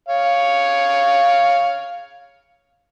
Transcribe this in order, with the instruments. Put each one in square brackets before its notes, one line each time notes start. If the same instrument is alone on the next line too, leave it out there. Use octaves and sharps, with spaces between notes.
[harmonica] C#5 F5